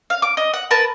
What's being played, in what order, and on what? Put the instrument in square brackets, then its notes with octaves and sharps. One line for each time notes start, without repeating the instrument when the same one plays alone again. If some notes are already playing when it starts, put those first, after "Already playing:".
[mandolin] F5
D6
D#5
F#5
A#4 B4 A5